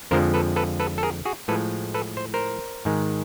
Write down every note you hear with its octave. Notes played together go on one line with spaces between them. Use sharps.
F2 D3 F3 G#3 A#4 C5
A4 B4
A4 B4
A4 B4
A4
G#4 A#4
F#4 G#4
A2 F3 G#3 A4 B4
A4 B4
C5
A#4 C5
G#2 D#3 G#3